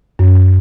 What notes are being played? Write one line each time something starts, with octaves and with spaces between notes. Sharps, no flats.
F#2